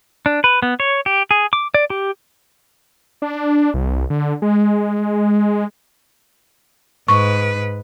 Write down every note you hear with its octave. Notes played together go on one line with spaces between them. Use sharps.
D4
B4
B3
C#5
G4
G#4
D6
D5
G4
D4
C2
D3
G#3
G#2 B4 C#6